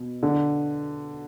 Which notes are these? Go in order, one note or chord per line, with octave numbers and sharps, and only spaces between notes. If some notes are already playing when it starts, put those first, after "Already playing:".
Already playing: B2
D3